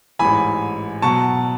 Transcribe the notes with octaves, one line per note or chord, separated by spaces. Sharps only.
A1 G#2 E3 G#5 B5
B2 F#3 A5 C#6